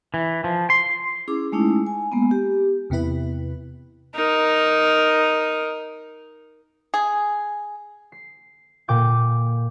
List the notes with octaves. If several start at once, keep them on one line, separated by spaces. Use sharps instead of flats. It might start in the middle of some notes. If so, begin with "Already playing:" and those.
E3
F3
C6
C#4 E4 G#4 D6
G#3 A3 C#4 D#4 E4
G#5
G#3 A#3 B3
G4
E2 C3 B3 E4 B4
D#4 A#4
G#4
C7
A#2 G5 D6 G6 G#6